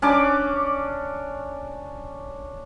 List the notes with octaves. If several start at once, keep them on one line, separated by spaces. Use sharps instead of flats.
C#4 D4 D6